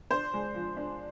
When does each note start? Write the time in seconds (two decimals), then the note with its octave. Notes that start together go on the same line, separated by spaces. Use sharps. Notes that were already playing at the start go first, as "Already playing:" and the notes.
0.10 D4 C5
0.33 G#3
0.55 F3
0.77 D4